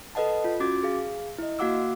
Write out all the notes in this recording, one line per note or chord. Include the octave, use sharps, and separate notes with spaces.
A4 B4 D#5 F#5 A5
F4
C#4 F#4 D6 A6
G#4 F5
E4 D#5
A#3 F#4 F5 F#5 D6 E6